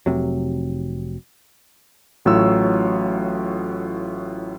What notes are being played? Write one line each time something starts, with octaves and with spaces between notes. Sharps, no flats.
F1 C3 F#3
A1 A2 F#3 F4 C#5 E6